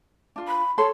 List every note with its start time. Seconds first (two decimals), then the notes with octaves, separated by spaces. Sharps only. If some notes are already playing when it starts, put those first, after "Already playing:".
0.36 D4 F4
0.47 B5
0.78 A4 C#5 C6